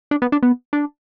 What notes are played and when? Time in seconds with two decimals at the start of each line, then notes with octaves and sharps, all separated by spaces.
0.11 D4
0.22 B3
0.32 D4
0.43 B3
0.73 D4